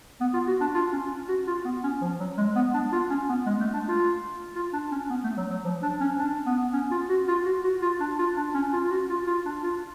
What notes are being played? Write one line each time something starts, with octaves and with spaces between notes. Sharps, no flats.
B3
F4
F#4
D4
F4
C#4
F#4
F4
B3
C#4
F3
F#3
G#3
B3
D4
F4
C#4
B3
G#3
A3
D4
F4
F4
D4
C#4
B3
A3
F#3
F#3
F3
D4
C#4
D4
B3
C#4
F4
F#4
F4
F#4
F#4
F4
D4
F4
D4
C#4
F4
F4
F#4
F4
F4
D4
F4